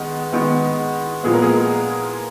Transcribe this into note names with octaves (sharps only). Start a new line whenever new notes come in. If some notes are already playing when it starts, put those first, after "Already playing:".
Already playing: D#3 G#3 B3
D#3 G#3 B3
A#2 F3 G#3 B3 G#4
A#4
G#4